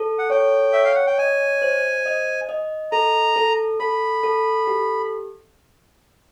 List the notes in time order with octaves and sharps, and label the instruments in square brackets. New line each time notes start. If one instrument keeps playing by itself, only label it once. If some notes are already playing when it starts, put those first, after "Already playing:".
Already playing: [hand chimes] A4
[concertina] F#5
[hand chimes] C#5 [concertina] G5
[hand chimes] C#5 [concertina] E5
[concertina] F5
F#5
G5
[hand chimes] D#5 [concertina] G#5
[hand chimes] C5
D#5
D#5
[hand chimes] A4 [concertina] A#5
[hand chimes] A4
[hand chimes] A4 [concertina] B5
[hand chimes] A4
G4